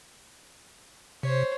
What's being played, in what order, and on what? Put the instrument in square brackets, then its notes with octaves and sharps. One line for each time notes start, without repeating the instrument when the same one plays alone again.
[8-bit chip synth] C3 [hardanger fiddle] C5 C#5